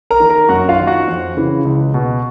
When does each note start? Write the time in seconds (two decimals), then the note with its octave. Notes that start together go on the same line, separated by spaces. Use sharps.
0.10 A#4 A#5
0.20 D#3
0.30 A#4 A#5
0.49 F#2 F#4 F#5
0.69 F4 F5
0.79 D#3
0.87 F#4 F#5
1.07 F2
1.37 C#3 E3
1.65 C#2
1.94 B2